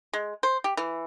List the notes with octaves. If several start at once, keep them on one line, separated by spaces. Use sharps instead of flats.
G#3
C5
G4
E3